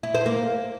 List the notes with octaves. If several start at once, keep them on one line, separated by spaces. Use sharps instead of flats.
E4
C5
A#3